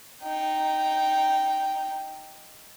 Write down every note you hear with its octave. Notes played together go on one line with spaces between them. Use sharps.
D#4 G5